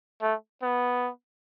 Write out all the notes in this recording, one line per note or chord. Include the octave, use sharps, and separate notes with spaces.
A3
B3